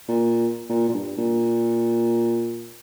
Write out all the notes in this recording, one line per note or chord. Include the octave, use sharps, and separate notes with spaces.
A#2
A#2
A#2
G2
A#2